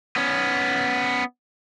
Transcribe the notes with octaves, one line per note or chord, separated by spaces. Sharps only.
B3 C#4